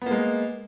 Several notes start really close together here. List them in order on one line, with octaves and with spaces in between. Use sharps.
B3 A#3 G#3